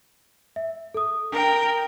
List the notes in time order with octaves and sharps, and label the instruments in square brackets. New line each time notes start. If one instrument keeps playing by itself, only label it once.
[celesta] E5
A4 D#6
[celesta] D4 [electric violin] A#4 G5